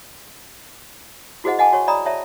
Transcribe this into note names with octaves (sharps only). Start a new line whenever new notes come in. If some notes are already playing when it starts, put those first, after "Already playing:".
E4 F#4 G#4 C5 D#5 F#5
D#5 F#5 G#5 A5 D6
F#4 C#5 C#6
D5 D#5 A#5 B5 D#6
C#5 D5 E5 A5 A#5